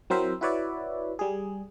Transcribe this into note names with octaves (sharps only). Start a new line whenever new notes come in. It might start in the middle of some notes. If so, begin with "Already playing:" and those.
F#3 C4 E4 A#4 C5 E5
E4 F#4 B4 C#5 D5 E5
G3 G#4